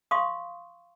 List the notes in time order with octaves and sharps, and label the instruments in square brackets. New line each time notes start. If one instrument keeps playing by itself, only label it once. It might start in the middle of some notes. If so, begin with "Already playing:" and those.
[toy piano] F5 C6 C#6 D#6